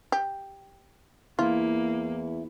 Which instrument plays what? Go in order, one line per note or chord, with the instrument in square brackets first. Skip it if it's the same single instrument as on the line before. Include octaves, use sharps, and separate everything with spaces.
[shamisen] G4
[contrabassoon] E2 [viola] A#3 [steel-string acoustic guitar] E4 [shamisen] F4